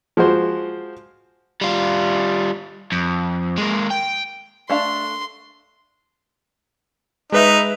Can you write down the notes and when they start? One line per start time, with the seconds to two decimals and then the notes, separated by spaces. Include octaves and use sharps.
0.17 F3 G#3 F#4 C5
1.61 G3 F4
2.92 F2
3.58 G#3 A#3
3.91 G5
4.69 A3 D4 F5 C6
7.32 G#3 D#4 B4 E5